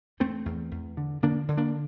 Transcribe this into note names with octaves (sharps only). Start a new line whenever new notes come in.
E2 A3 C4
E2
E2
D3
D3 A#3 D4
D3
A#3 D4